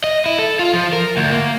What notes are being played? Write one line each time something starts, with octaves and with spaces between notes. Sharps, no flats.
D#5
E4
A4
F4
F3
A#4
D2
A#3